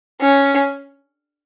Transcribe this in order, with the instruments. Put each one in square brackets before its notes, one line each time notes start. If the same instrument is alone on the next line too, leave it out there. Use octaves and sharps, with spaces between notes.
[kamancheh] C#4